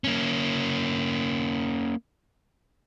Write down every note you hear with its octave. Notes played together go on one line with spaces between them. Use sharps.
A#3 C#4